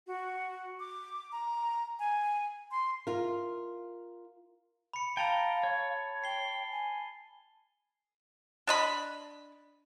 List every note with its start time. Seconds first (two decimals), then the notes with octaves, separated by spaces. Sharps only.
0.07 F#4
0.80 D6
1.32 A#5
1.99 G#5
2.71 C6
3.07 F4 A#4
4.93 B5 C#7
5.17 F5 G5 A5 A#5 A6 F7
5.63 C#5
6.24 G5 C7 G7
6.71 G#5
8.67 D4 D#5 B5